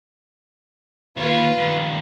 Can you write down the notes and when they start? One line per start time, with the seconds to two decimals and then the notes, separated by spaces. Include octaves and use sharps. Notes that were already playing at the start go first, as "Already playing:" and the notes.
1.17 D#2 F4 B4 C#5
1.57 G2 D#3